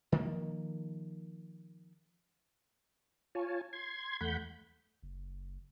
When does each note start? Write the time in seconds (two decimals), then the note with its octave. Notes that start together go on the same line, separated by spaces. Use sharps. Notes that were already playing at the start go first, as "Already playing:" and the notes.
0.12 D#3 F3 A#3
3.35 F4 C#5 G#5 A5
3.73 C6 G#6
4.21 E2 A3 F#5 B5 G6
5.03 F#1